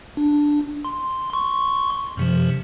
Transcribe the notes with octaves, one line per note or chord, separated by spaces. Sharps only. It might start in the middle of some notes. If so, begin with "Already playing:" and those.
D4
C6
C6 C#6
F#2 C3 F3